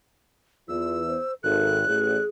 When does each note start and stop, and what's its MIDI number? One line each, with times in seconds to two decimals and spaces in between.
0.68 1.14 40
0.68 1.02 65
0.68 1.32 88
1.08 1.34 72
1.43 1.84 32
1.43 1.79 69
1.43 2.23 90
1.87 2.16 33
1.87 2.28 68